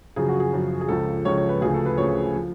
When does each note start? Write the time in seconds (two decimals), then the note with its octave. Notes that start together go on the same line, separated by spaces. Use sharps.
0.16 F#2 C#3 F3 G#4
0.28 F#4
0.40 G#4
0.53 F#2 C#3 F3
0.81 G#4
0.88 C#2 C#3 F3 A4
1.25 C#2 C#3 F3 C#5
1.37 C#5
1.49 B4
1.61 D2 C#3 F3 G#4
1.74 A4
1.86 B4
1.98 D2 C#3 F3 C#5
2.34 F3